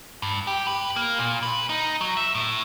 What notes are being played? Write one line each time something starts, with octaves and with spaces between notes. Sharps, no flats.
G2
G4
B4
A#3
A#2
B4
D#4
F#3
E5
A2